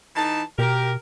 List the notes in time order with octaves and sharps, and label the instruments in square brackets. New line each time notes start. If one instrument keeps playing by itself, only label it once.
[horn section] E3 D#4 A5
[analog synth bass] B2 [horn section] G4 A#4